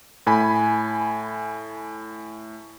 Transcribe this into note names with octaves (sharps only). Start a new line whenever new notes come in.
A2 G#5 B5